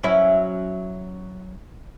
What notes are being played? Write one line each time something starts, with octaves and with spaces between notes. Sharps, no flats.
F#3 C#4 E4